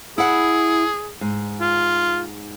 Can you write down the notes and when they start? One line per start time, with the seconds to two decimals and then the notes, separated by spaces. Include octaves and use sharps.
0.18 E4 G#4 F#5
1.21 G#2
1.61 F4